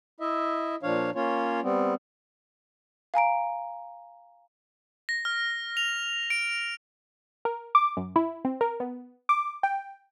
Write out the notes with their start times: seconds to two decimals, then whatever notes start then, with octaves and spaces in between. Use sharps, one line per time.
0.20 E4 D#5 E5
0.83 A#2 F3 D4 C#5 F5
1.15 A#3 C#4 F4 C#5
1.63 G3 B3 C4
3.14 F5 G#5 A#5 D7
5.09 A#6
5.25 F6
5.77 F7
6.30 D7
7.45 A#4
7.75 D6
7.97 F#2
8.16 E4
8.45 C4
8.61 A#4
8.80 B3
9.29 D6
9.63 G5